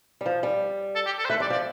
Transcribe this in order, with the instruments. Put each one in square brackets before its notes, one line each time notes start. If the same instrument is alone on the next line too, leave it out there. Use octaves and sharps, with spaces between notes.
[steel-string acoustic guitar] G3
F3
G3
[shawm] A4
G4
A4
C5
[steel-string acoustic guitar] A3 [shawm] B4
[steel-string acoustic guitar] G3 [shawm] D5
[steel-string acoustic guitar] F3 [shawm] D5